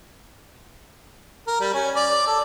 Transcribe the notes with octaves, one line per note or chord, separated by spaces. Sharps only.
A#4
G3
C#4
D5
A4